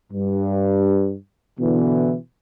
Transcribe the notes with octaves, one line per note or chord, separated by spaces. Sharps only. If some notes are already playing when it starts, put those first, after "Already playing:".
G2
B2 D3 E3